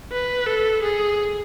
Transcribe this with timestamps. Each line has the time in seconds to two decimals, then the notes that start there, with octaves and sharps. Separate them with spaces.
0.12 B4
0.47 A4
0.82 G#4